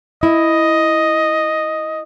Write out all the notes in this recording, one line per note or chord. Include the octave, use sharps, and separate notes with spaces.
E4 D#5